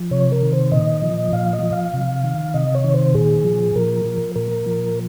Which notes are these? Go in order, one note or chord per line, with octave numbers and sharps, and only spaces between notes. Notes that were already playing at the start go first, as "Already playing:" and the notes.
Already playing: F3
C3 C#5
A#4
D#3
C5
A#2 D#5
F3
A#2 F5
D#5
F3
F5
C3
D#3
C3 D#5
C#5
D#3
C5
A#2 G#4
F3
A#2 A#4
F3
A#2 A#4
F3